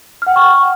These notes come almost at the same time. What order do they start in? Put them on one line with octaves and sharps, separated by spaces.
F6 F#5 G5 C#6